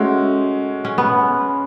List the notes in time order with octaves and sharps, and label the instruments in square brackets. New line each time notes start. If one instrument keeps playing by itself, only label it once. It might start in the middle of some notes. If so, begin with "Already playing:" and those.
Already playing: [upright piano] G#3 C#4 F#4 [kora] A3
[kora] C#4
B3